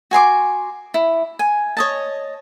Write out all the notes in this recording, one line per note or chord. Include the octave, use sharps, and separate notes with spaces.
F#4 G#5 C6 D6
E4
G#5
C#5 D#5 A5